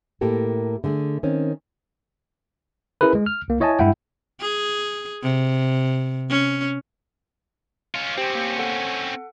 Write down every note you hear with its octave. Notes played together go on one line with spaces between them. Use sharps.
A2 A#3 G4 A4 A#4
D3 A3 G#4
D#3 C4 C#4
C#4 E4 G#4 A#4 B4
G#3
F6
C2 A#3
E4 C#5 D#5 E5 G#5 A5
G2 G#3 E4 E5 F#5 G5
G#4
C3
C#4
C#4 F4
C4 C#4 G4 C5 G5
A#3 C#7
A4 F#5